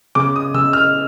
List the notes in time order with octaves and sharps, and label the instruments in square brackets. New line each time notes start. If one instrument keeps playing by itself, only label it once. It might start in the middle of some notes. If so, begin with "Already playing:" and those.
[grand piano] C#3 D6
D#6
C#3 E6
F6